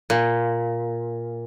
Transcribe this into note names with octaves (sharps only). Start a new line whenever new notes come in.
A#2